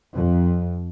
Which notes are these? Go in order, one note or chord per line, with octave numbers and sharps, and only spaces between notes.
F2